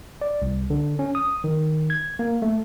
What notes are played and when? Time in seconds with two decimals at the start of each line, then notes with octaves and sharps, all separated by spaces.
0.22 D5
0.42 C2
0.70 D3
0.99 C#4
1.15 D#6
1.44 D#3
1.90 G#6
2.19 A#3
2.42 A3